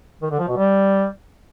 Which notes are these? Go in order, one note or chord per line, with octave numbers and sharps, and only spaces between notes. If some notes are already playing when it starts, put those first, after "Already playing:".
D#3
D3
F3
B2
G3